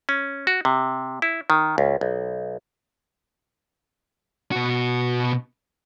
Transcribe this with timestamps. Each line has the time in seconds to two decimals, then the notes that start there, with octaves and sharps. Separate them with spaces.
0.09 C#4
0.47 F#4
0.65 C3
1.22 E4
1.50 D#3
1.78 C#2
2.01 B1
4.52 B2 F#4